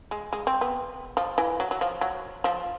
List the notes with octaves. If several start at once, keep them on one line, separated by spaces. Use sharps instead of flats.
G#3
G#3
C4
B3
F3
E3
F#3
F#3
F3
F#3
F3